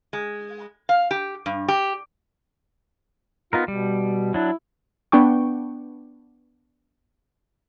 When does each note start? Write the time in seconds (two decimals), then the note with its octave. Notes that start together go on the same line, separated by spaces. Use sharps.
0.13 G#3
0.89 F5
1.11 G4
1.46 G2
1.68 G4
3.53 B3 D#4 F4 A#4
3.68 B2 G3
4.34 F#3 D4 E4
5.12 B3 D4 G5 C#6